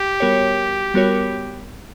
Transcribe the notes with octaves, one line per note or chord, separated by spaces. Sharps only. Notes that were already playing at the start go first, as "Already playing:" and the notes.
Already playing: G4
G3 B3 F#4 A#4 C#5
G3 B3 F#4 A#4 C#5